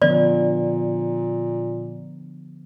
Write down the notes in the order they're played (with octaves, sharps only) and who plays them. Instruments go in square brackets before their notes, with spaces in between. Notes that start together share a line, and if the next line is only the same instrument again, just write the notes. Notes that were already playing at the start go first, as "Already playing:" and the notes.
[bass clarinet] A#2 [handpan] D3 F3 B3 [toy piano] D5